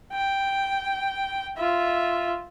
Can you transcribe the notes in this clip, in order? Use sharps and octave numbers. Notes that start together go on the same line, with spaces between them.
G5
F4 E5